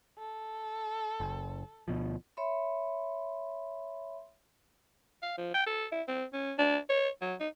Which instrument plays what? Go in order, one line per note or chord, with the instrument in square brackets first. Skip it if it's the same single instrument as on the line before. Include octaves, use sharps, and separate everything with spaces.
[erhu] A4
[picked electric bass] F#1
D2 B2 F3
[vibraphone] C#5 E5 B5 C6
[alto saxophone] F5
F3
G5
A4
E4
C4
C#4
D4
C#5
F#3
D#4